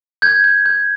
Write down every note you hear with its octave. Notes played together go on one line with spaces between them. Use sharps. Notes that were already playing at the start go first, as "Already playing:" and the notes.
G6 G#6
G6
G6